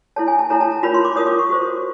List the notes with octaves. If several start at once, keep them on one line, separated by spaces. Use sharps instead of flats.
E4 A4 C#5 A5
G#5
A5
E4 A4 C#5 A#5
A5
A#5
F4 A#4 C#5 B5
C6
D6
F4 A#4 C#5 D#6
D6
C#6
F#4 A4 C5